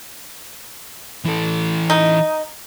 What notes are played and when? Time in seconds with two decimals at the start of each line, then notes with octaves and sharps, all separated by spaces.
1.24 E3 A4
1.90 D#4